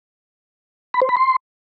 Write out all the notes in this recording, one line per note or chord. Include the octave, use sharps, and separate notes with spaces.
B5
C5
B5
C6